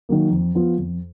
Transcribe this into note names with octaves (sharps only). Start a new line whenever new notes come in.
D#3 F#3 A#3
F2
F3 B3 F4
F2